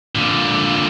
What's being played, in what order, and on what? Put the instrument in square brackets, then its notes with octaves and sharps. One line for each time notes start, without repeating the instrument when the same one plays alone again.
[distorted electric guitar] A#2 D3